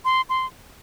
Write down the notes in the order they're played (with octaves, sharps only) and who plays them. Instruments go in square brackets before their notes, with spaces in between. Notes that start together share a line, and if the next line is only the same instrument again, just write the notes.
[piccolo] C6
C6